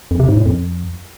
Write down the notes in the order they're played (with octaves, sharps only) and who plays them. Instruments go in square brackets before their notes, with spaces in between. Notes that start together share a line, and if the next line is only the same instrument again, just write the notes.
[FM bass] F2
C3
G#2
A2
F2